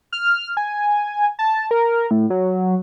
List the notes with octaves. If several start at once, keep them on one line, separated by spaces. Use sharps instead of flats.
F6
G#5
A5
A#4
A2
F#3